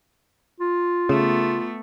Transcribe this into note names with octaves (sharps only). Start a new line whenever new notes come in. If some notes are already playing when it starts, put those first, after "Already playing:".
F4
C#3 A3 B3